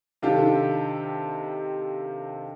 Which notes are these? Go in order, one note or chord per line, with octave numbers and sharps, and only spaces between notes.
C3 D#3 D4 F4 G4 A4